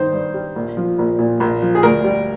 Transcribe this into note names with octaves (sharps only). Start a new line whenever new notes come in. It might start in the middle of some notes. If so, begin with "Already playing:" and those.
Already playing: G2 D#3 D#4 C5
G2
G3
A#1
F3
A#1
A#2
A#1
F3
G#4
D2 A#4
G3